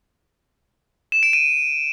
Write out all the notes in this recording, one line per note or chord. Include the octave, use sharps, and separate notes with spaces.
E7
D7
D#7